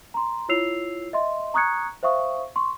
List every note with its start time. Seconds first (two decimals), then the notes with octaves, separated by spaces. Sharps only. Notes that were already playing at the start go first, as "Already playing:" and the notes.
0.14 A#5 C6
0.49 E4 F4 C#5 E6 C7 F7
1.13 D#5 E5 C6
1.54 A#5 C#6 D#6 F#6 G#6 C#7
2.03 C5 E5 F5 C#6 D#6
2.56 C6 C#6